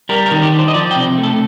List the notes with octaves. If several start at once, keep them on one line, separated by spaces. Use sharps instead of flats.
G3 A#4
A#4
D#3
G4
D4
C5
D#5
F3 D5
G5
C3
A3
A4